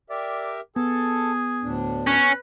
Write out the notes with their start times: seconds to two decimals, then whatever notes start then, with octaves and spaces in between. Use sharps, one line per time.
0.10 G4 A#4 D5 E5
0.76 B3 G#4 A4 A5
1.63 D2 A2 D4
2.07 C#4 B4